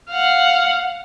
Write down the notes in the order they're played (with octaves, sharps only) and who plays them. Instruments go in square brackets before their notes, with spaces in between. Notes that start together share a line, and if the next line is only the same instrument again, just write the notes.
[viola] F5 F#5